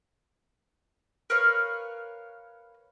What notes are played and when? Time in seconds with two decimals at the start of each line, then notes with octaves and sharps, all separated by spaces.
1.30 A#4 B4 C#5 F5